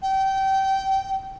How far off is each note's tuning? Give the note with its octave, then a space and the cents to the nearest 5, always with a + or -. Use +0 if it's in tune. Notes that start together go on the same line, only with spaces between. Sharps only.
G5 -25